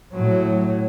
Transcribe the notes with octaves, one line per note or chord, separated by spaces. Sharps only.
A2 F#3